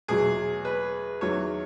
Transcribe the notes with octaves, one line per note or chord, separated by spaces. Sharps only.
E2 B2 F#3 G#4
B4
E2 D#3 F#3 C#5